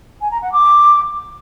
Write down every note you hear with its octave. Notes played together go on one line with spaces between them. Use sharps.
G#5
A#5
F#5
D6